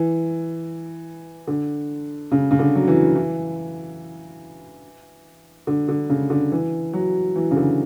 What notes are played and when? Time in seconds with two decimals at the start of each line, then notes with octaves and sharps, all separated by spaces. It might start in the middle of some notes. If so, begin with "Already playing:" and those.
Already playing: E3
1.47 D3
2.32 C#3
2.51 C#3
2.59 D3
2.75 F#3
2.88 E3
3.15 E3
5.67 D3
5.88 D3
6.10 C#3
6.30 D3
6.52 E3
6.93 F#3
7.36 E3
7.51 C#3
7.56 D3